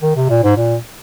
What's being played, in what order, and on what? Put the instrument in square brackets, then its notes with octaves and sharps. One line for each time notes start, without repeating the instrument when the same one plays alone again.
[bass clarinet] D#3
C3
A#2
G#2
A#2